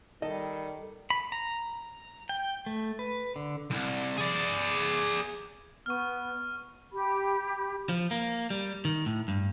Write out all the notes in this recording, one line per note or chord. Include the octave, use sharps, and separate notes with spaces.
D#3 G3 A4 D#5
B5
A#5
G5
A3
B4
D3
C2
G#4 D5
B3 C#6 F6
G4 B5
F3
A#3
G3
D#3
A2
G2